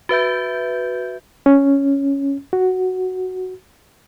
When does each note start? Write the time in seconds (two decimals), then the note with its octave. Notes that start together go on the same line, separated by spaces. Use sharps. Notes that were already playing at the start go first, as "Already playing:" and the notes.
0.09 F#4 B4 E5 G6
1.46 C#4
2.53 F#4